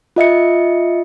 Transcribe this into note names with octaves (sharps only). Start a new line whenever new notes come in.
F4 D#5 E5 C#7